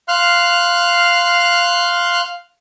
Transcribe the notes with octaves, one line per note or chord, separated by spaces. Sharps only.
F5 C6 F6 F#6